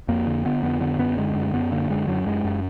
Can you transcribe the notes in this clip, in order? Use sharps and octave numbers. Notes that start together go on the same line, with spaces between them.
F2 A#3
D3
D3 B3
F2 B3
D3 B3
F#2 B3
D3 G#3
F#2
F#2 B3
D3 A#3
F#2 G#3
F#2 F#3
F#2 G#3
F#2